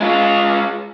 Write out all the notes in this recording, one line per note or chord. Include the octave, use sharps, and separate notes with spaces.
G#3 F4